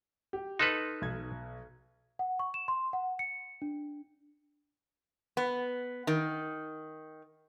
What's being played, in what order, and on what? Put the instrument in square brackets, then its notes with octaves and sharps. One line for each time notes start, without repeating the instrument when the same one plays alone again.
[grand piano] G4
[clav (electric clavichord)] D#4 A4 B4 [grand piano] C6 F6 F#6
[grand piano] B1 G#6
[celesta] F#5
C#6
E7
C6
F#5
C#7
D4
[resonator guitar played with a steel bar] B3
D#3